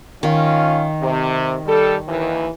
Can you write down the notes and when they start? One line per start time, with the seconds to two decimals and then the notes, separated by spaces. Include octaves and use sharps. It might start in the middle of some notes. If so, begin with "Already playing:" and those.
0.23 D#3 C#4 F4 F5
1.02 C3
1.67 G3 A4
2.08 D#2 E3